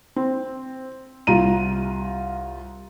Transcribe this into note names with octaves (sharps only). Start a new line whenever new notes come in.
C4
C2 F4 A#5 D#7